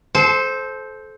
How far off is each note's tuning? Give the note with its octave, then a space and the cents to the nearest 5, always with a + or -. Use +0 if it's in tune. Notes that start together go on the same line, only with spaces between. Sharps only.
A4 -25 C5 +0